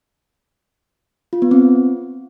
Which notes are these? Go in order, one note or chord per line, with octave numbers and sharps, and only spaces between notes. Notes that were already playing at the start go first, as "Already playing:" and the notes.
F4
B3
C4